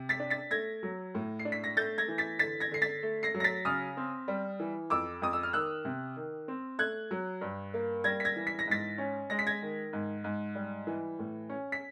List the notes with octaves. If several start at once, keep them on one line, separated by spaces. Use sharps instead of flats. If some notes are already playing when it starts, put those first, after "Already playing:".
Already playing: C3
A6 B6
D4
A6 B6
A3 G#6 A#6
F#3
A2
C7
D4
B6
A#6
A3 G6 A6
G#6 A#6
E3
A6 B6
D3 A6 B6
G#6 A#6
D3 C7
A6 B6
A3
A#6 C7
F#3
A#6
A6 B6
C#3 D#6 F6
C4
G3
E3
F2 D6 E6
F2 D#6
E6
F6
D#3 E6 F#6
C3
D#3
C4
A3 F#6 G#6
F#3
G2
A#3
G3 G#6 A#6
B6
G#6 A#6
E3
B6
A#6
G#2 A6 B6
C#4
G#3 A#6
B6
G#6 A#6
D#3
G#2
G#2
G3
E3
A2
C#4
B6